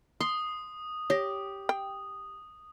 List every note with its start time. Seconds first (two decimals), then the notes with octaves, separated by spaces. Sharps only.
0.20 C6 D#6
1.10 G4 C#5 A#6
1.69 G5